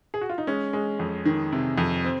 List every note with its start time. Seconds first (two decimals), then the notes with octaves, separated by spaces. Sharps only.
0.14 G#4
0.21 F#4
0.29 F4
0.38 D#4
0.47 G#3 C#4
0.73 G#3
0.99 F2
1.25 D#3
1.52 C3
1.78 F2
2.05 C4